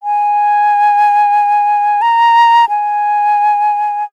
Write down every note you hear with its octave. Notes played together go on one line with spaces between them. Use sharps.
G#5
A#5
G#5